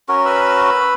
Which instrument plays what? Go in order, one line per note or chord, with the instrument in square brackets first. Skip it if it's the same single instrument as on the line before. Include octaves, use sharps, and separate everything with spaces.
[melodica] C#4 F#4 A#4
[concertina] B4 B5 E6